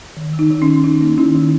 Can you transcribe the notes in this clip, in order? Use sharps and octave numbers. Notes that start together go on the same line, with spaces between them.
D#3
D#3
D#4
D#3
C#4
D#3
D#3 D#4
A#3
D#3 C#4 E4
D#3